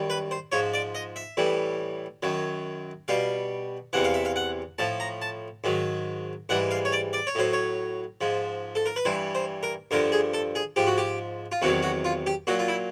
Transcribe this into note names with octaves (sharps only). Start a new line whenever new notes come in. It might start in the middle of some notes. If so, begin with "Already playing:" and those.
Already playing: F#2 D#3 G3
B4
C5
G#2 F3 C#5
D5
D#5
E5
A2 E3 G3
F#2 D#3 F#3
B2 G3 F5
E2 C3 E3 F#5
F5
E5
F5
F#5
A2 F3 A5
A#5
A5
G#2 D#3 F#3
G#2 E3 G3 F#5
F5
C#5
D5
D5
C#5
A2 F#3 C5
C#5
G#2 F3
A4
A#4
B4
G2 E3 G3 C5
C5
A#4
G2 D3 F3 A#4
G#4
A4
G#4
G#2 F3 G4
F#4
G4
F4
E2 C3 D#3 F#3 F#4
F#4
F4
G4
A#2 F#3 F#4
F4
E4